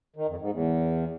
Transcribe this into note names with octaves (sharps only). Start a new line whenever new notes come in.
D#3
F2
G#2
E2